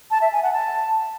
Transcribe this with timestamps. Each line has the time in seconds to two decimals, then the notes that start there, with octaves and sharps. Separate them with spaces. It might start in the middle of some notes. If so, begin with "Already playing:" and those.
0.11 A5
0.22 E5
0.32 G#5
0.43 F#5
0.54 A5